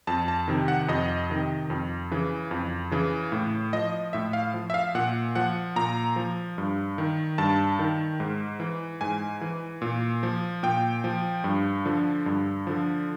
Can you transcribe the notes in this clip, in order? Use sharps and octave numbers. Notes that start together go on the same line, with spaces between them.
F2 A5
A5
C3 D#3
F#5
F2 D#5
C3 D#3
F2
C#3 E3
F2
C#3 E3
A2
F3 D#5
A2 E5
F5
F3
E5
F5
A#2 F#5
F3 F#5
A#2 A#5
F3
G2
D#3
G2 A5
D#3
G#2
E3
G#2 G#5
E3
A#2
F3
A#2 G5
F3
G2
D3 F3
G2
D3 F3